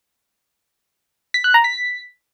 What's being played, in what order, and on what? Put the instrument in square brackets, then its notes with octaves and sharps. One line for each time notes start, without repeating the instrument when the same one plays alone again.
[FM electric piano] B6
F#6
A#5
B6